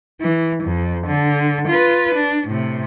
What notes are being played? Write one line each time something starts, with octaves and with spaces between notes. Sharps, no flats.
E3
F2
D3
F4 B4
D4
A2 C3